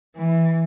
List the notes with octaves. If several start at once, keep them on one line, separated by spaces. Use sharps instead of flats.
E3